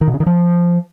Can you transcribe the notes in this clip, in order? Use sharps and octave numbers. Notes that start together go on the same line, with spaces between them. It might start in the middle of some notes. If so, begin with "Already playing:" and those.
D#3
B2
C#3
D#3
F3